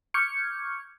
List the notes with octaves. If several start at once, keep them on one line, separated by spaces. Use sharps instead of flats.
C#6 D6 F6 G6 G#6 C#7